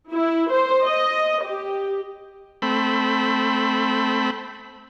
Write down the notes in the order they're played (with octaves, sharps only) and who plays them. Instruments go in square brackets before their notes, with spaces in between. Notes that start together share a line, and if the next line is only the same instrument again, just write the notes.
[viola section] E4
C5
D#5
G4
[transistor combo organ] A3 C4 B5